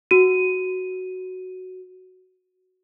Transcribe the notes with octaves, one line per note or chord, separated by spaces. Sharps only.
F#4 D#7